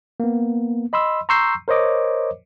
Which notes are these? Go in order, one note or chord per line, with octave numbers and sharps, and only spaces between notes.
A#3 B3
D#5 B5 C6 E6
A#5 C6 C#6 E6 G6 C7
A#4 C5 C#5 D#5 D6